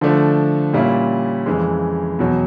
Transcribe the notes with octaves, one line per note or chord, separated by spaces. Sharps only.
D3 F3 A3 D4
A#2 G3 A#3 C#4 E4
F2 C#3 E3 G#3
E2 B2 F#3